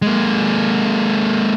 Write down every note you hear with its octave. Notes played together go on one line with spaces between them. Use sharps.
G#3 A#3